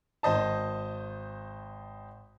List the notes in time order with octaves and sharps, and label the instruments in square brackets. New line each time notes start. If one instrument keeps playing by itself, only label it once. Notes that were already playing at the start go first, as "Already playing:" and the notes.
[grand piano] G#1 C5 D#5 A5